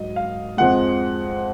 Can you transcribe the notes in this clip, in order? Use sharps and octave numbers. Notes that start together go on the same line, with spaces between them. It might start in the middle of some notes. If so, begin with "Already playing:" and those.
Already playing: G#2 F#3 D#5
F5
F2 F3 G#3 F#5